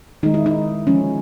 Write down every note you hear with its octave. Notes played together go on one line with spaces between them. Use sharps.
D#3 G#3 D#4
E4
D#4
D3 F3 G#3 C#4